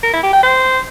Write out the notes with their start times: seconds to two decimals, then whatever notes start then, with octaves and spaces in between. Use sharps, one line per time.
0.03 A#4
0.13 E4
0.23 G4
0.33 G5
0.43 C5